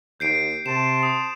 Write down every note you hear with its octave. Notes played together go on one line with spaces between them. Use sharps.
D#2 G6 C7 D7
C3 A5 C6 E7
D#6